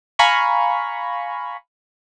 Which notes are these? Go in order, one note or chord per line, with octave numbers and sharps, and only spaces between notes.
F5 G#5 A#5 B5 C#6